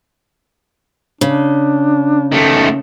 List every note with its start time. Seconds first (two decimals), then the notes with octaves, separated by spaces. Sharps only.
1.21 C#3 D4
2.32 D#3 A3